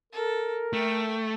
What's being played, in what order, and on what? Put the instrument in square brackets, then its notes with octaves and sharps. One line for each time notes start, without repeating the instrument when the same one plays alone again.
[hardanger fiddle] A4 [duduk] A#4
[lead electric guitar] A3 [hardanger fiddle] G5